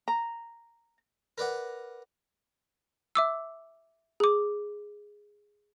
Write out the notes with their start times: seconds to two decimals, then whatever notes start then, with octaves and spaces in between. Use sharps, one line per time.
0.08 A#5
1.38 A#4 B4 D5 F#5
3.15 E5 D6 E6
4.20 G#4 D6